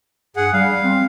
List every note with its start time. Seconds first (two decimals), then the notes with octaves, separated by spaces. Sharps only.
0.36 G2 G#4 F#5
0.53 G3 F5
0.84 C4